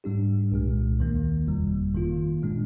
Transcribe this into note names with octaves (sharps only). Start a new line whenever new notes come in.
G#2 G3 D4 G4
C2 A#2 G#3
D#2 D#3 A#3
G1 F2 C3 G3
G2 D#3 A#3 F4
A#2 G#3 D4